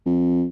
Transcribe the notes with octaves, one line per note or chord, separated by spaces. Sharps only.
F2